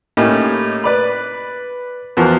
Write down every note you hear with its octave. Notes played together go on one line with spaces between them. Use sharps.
A2 A#3 C#4 D#4 G4
B4 D5 B5
E2 E3 F3 F#4 A#4